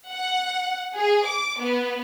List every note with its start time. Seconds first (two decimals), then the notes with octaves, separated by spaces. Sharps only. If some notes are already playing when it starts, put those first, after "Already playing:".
0.10 F#5
0.96 G#4
1.25 D6
1.60 B3